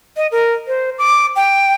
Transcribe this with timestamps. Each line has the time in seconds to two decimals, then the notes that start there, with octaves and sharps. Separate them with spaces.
0.17 D#5
0.32 A#4
0.67 C5
0.98 D6
1.36 G5